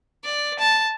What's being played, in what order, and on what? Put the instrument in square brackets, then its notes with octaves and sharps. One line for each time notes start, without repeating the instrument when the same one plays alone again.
[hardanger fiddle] D5
A5